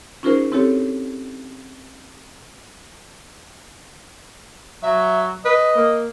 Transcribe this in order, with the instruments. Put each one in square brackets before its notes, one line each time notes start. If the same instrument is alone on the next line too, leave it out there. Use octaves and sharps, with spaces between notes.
[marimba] C#4 D#4 F4 G#4 A#4 C5
C4 E4 G4 A4 C#5
[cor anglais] F#3 [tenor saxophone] E5
[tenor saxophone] B4 [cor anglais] D#5
[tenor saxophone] A#3